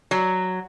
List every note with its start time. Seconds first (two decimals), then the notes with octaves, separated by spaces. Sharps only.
0.11 F#3